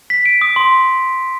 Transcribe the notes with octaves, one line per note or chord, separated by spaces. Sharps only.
B6
D7
D#6
C6